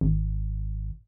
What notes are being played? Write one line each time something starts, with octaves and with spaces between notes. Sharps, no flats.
G#1